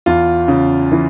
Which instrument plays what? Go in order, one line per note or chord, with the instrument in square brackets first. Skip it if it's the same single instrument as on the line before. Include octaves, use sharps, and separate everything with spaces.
[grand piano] E2 F4
C#3
E3